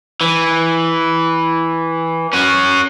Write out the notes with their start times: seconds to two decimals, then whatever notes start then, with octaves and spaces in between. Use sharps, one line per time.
0.21 E3
2.33 C#4 F#4